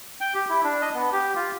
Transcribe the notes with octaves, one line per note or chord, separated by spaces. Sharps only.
G5
G4
E4
D4
D#5
B3
G4
F4